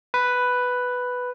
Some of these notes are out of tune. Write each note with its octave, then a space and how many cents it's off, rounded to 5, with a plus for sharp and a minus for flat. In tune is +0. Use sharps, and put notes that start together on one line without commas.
B4 +5